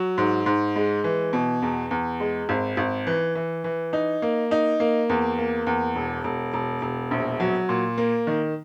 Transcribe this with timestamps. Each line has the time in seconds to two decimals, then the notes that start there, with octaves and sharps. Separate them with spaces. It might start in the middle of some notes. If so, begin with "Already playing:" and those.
Already playing: F#3
0.18 G#2
0.46 G#2
0.76 G#3
1.04 E3
1.33 B2
1.62 E2
1.91 E2
2.20 G#3
2.49 G#1
2.77 G#1
3.07 E3
3.35 E3
3.64 E3
3.93 D#4
4.22 A#3
4.51 D#4
4.80 A#3
5.09 E2
5.38 A#3
5.67 E2
5.95 E1
6.24 E1
6.53 E1
6.82 E1
7.11 A#1
7.40 F#3
7.69 A#2
7.98 A#3
8.27 D#3